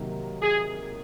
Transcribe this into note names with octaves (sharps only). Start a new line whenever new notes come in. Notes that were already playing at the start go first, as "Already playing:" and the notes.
Already playing: C3 D#3 F#3 A#3
G#4